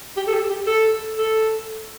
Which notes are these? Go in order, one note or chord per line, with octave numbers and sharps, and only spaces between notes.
G4
A4
G4
G4
A4
A4